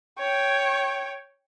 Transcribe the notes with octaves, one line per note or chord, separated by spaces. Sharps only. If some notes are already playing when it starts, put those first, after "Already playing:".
C#5 G5